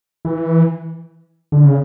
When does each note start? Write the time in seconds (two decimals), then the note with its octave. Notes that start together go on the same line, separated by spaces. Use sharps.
0.25 E3
1.52 D3
1.65 C#3